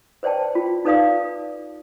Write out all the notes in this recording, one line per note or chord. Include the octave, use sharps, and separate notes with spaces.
B4 C5 D5 G5 A5
F4
D#4 A4 B4 D5 F5 D#6